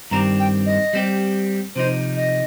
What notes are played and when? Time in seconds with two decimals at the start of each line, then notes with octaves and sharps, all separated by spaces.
0.11 G2 D#3 C4 G4 A#5
0.39 G5
0.66 D#5
0.93 G3 C4 G4
1.75 C3 F3 D#4 C5
2.16 D#5